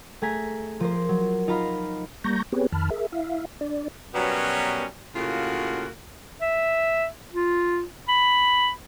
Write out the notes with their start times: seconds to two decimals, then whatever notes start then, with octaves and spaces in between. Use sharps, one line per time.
0.22 A3 G#4 G#5 A#5 B6
0.80 F3 A#4 C5
1.09 F#3
1.48 D#4 F4 F5 A#5 B5
2.24 G3 A#3 A#5 C#6 G6 A#6
2.52 B3 C4 G4 G#4 B4 C#5
2.72 F2 D#3 A5 B5 F6
2.90 G#4 A#4 E5
3.12 E4 E5 F5
3.61 D4 D5
4.14 B2 F#3 G3 B3 C#4 A#4
5.15 A2 C#3 A#3 F4 F#4
6.41 E5
7.33 F4
8.09 B5